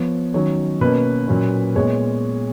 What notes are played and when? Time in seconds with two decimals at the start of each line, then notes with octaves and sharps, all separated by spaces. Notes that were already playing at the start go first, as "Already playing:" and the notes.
Already playing: F3 B3 C#5
0.34 D#3 F#3 C#4 C#5
0.81 B2 A#3 C#4 B4
1.28 A#2 F#3 A#3 C#4
1.75 A#2 G#3 B3 C#5